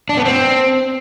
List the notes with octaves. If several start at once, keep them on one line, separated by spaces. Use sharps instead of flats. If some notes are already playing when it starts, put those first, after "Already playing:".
D4
B3
C4